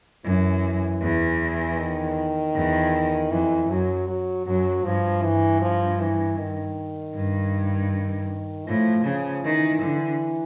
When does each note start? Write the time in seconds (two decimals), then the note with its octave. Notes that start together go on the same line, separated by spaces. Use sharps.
0.25 F#2 E3
1.01 E2
1.78 D#3
2.55 E2
3.31 F2 E3
3.69 F#2 F#3
4.08 F#3
4.46 F#2 F#3
4.84 G2 F3
5.23 G2 E3
5.61 F3
5.99 E3
6.37 D#3
7.15 G2
8.67 A2 F3
9.05 C#3 F3
9.43 D#3 E3
9.82 D3